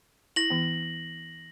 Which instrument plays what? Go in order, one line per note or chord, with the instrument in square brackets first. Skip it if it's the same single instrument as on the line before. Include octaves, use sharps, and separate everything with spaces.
[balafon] E4 [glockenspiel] A#6 F#7
[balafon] E3 B3